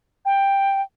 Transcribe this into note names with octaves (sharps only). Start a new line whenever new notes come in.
G5